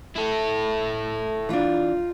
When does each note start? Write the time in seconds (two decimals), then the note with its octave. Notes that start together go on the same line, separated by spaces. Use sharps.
0.16 E4 A4
1.49 E3 D4 D#4 F4